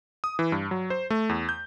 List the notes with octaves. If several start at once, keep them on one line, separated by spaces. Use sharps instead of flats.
D#6
E3
G2
F#3
C5
A3
E2
G6